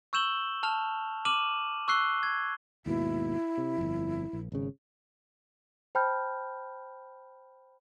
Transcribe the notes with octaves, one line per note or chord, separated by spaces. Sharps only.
C#6 E6 G6 E7 F#7 G7
A5 F6 F7
D6 F6 D#7 E7 F#7
C#6 E6 F#6 C7 G7
G#6
D#2 G#2 B2 E4
C3
G1 F2
A#1
G#1 C#3
C5 G5 A5 B5 F6 G6